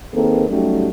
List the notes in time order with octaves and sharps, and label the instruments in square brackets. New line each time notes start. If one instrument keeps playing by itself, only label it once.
[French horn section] D#3 A#3 C4 G#4 A4 B4
F#3 G3 A3 C#4 D#4 G4